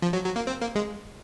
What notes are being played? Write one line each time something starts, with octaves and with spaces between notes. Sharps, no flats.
F3
F#3
F#3
A#3
C4
A#3
G#3